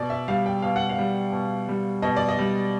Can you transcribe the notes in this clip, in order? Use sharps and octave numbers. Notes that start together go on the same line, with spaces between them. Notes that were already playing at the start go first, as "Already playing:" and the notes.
Already playing: B2 D5
E5
G3 F5
G5
B2 F5
F#5
F5
G3
B2
G3
B2 D#5
D5
D#5
G3